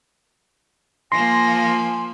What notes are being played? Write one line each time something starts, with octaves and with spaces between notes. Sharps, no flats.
F3 A#3 G#5 C6 A#6